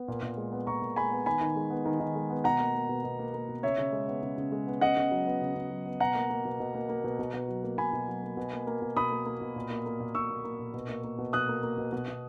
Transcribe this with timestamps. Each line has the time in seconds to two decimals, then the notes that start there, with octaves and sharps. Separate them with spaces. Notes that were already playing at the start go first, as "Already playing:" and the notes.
Already playing: B3
0.08 A#2
0.22 A#2
0.37 G#3
0.52 B3
0.67 A#2 A#5 C#6
0.82 A#2
0.96 G#3 G#5 B5
1.12 B3
1.26 D#3 G#5 B5
1.41 D#3
1.56 G#3
1.70 B3
1.85 D#3
2.00 D#3
2.15 G#3
2.30 B3
2.44 B2 F#5 A#5
2.60 A#3
2.74 A#3
2.89 B2
3.04 B2
3.19 A#3
3.34 A#3
3.49 B2
3.63 C#3 C#5 E5
3.78 C#3
3.92 G#3
4.08 B3
4.23 C#3
4.38 C#3
4.52 G#3
4.67 B3
4.81 C#3 D#5 F#5
4.97 C#3
5.11 F#3
5.27 B3
5.41 C#3
5.56 C#3
5.71 F#3
5.86 B3
6.00 B2 F#5 A#5
6.15 A#3
6.30 A#3
6.45 B2
6.60 B2
6.74 A#3
6.89 A#3
7.04 B2
7.19 B2
7.34 B2
7.48 F#3
7.63 A#3
7.78 B2 G#5 B5
7.93 B2
8.08 F#3
8.23 A#3
8.37 B2
8.52 A#3
8.67 A#3
8.82 B2
8.96 B2 B5 D#6
9.11 A#3
9.26 A#3
9.41 B2
9.56 A#2
9.70 A#3
9.86 A#3
10.00 A#2
10.15 A#2 C#6 E6
10.30 A#3
10.44 A#3
10.59 A#2
10.74 B2
10.89 A#3
11.04 A#3
11.18 B2
11.33 B2 D#6 F#6
11.48 A#3
11.63 A#3
11.78 B2
11.92 B2
12.08 B2